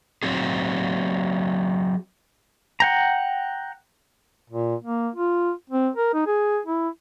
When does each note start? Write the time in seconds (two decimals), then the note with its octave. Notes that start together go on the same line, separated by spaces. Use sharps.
0.23 F#3 C4 G#4
2.80 F#5 G5 A#5
4.50 A#2
4.84 A#3
5.16 F4
5.70 C4
5.96 A#4
6.14 D#4
6.27 G#4
6.66 E4